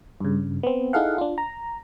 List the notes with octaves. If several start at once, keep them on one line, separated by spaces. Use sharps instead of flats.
G2 C#3
B3 C4
D#4 E4 G#4 A4 F5 F#5
D4 F4
A#5